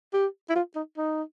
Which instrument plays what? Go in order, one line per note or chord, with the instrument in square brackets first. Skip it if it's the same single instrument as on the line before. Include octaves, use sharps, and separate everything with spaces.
[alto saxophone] G4
E4
F4
D#4
D#4